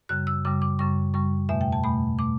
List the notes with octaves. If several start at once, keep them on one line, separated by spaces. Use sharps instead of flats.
F#2 C#3 G3 F#6
E6
F#2 C#3 G3 D6
D6
F#2 C#3 G3 C#6
F#2 C#3 G3 C#6
E2 B2 A3 E5
G5
A5
E2 B2 A3 B5
B2 A3 D6